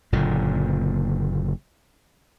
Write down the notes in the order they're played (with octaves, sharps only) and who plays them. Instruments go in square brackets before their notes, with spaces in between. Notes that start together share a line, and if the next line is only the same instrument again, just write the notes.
[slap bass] F#1 A#2 D3